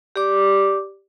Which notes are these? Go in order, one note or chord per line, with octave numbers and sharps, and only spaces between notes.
G4 D5 D6